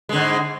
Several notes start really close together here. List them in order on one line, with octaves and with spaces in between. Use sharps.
G#3 D3 G#2